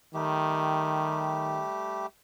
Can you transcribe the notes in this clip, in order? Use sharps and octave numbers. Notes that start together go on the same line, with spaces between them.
D#3 G3 A3 G4